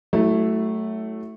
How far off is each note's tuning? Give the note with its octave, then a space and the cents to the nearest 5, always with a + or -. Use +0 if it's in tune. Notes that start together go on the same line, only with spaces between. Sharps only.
F#3 +30 A3 +0 E4 +0